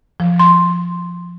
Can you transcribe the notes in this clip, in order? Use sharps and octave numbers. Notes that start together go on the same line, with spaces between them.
F3
C6